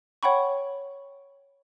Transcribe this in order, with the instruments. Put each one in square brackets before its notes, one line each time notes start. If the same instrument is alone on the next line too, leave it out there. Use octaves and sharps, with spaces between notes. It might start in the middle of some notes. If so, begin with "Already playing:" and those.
[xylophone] C#5 F#5 G5 B5 C#6